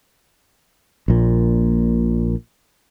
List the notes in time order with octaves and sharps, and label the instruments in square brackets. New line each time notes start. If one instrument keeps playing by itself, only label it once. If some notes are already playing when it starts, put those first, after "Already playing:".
[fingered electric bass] A#1 A#2